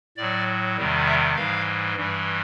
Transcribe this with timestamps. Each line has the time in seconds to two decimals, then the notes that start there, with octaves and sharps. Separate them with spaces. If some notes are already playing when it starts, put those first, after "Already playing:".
0.17 A2 F#3 D5
0.77 E2 C3 D#3 G3
1.06 E5
1.36 G#2 E3 G3 F5
1.96 G2 E3 G3